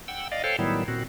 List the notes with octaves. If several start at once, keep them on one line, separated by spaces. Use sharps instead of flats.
F#5 G5 E6
D5 D#5 F5
A4 C5 C#5 F5 G5
A2 D#3 F#3 G3 B3 E4
A#2 C4 F#4